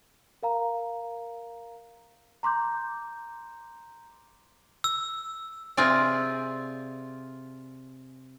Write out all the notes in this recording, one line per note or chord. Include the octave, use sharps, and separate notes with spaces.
A#4 F5 A#5
A#5 C6 D6 G6
E6
C3 C4 F4 G#4 D5